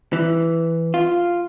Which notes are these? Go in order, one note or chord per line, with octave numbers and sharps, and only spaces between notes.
E3
F4